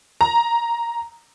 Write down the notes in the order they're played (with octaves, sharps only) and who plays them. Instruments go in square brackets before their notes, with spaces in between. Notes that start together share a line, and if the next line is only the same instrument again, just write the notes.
[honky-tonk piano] A#5